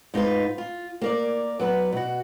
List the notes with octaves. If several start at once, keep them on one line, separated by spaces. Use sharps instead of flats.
G#2 D#4 F4 B4
F4
A#3 A#4 D5
F#3 B3 B4
B2 F#4